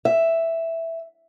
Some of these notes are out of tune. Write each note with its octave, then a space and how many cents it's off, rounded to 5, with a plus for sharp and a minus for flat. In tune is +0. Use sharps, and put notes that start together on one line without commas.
E5 +0